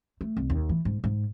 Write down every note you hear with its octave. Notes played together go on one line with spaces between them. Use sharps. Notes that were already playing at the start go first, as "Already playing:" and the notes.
A3
C2
D#2
E3
G#2
G#2